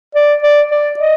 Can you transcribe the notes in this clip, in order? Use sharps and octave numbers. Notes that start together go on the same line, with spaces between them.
D5
D5
D5
D#5